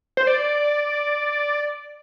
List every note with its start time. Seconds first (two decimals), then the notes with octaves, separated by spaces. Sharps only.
0.17 C5
0.27 D5